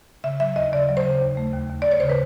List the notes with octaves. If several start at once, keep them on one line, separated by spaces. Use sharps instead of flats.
C#3 E5
F#3 E5
D#2 D#5
C#3 D5
F#3
C5
C#3
D#2
A3
D#2
D#2
D5
D#2
C#5
C#3 C5
B4